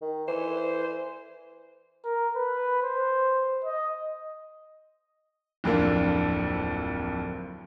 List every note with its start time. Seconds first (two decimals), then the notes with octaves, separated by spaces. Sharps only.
0.02 D#3
0.28 E3 C5
2.05 A#4
2.36 B4
2.83 C5
3.65 D#5
5.64 D1 F2 D3 A#3 D4